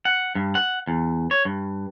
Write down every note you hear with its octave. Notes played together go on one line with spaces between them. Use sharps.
F#5
G2
F#5
E2
C#5
G2